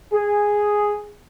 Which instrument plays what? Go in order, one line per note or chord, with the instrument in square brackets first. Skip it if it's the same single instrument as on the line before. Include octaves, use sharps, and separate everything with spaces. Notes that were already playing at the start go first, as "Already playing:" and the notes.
[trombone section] G#4